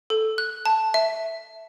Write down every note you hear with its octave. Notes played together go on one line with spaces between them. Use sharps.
A4
F#6
A5
E5